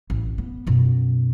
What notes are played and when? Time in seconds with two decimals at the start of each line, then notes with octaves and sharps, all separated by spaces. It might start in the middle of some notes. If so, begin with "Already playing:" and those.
0.10 A1
0.38 B3
0.67 F#2 B2